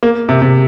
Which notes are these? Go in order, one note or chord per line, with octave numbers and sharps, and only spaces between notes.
A#3
C3
C3